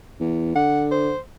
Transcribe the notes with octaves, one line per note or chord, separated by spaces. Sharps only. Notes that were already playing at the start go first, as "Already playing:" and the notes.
E2
D3 F#5
C5